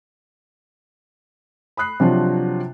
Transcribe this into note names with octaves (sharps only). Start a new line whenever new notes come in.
B5 D#6 F#6 C7
C3 F3 F#3 D4 F4 C5